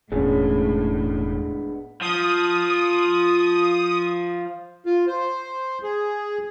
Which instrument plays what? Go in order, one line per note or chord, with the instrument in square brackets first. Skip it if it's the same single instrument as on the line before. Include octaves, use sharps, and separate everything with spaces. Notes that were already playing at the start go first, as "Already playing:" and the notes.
[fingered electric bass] E1 [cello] A2 [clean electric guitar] G#3 B3 D4 [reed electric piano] C#4 G#4
[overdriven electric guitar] F3 [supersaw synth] D#6
[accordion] F4
C5
G#4